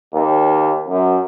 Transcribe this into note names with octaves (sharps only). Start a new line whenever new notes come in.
D#2
F#2